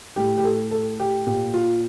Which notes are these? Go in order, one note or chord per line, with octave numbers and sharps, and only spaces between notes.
A2 G4
G4
A4
A4
G4
A#2 G4
F4